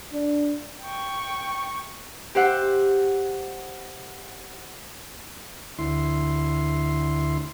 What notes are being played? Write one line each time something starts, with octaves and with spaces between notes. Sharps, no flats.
D4
G5 C#6
G4 C5 E5 F#5
D2 E4 C6